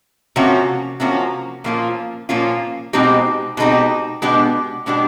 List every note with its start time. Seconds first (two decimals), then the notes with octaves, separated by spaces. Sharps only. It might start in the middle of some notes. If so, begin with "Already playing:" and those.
0.36 C3 F3 A#3 C#4 F#4
1.00 C3 F3 A#3 C#4 F#4
1.64 A#2 F3 A#3 C#4 F4
2.29 A#2 F3 A#3 C#4 F4
2.93 B2 G#3 C4 D#4 G4
3.57 B2 G#3 C4 D#4 G4
4.22 B2 G#3 B3 D4 G4
4.86 B2 G#3 B3 D4 G4